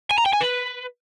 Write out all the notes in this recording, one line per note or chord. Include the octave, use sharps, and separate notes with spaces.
G#5
A#5
G5
G#5
B4